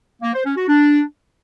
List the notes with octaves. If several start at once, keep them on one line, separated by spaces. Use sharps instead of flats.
A#3
C5
C#4
F#4
D4